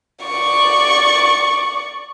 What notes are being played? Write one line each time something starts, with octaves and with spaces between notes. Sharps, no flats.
D5 C#6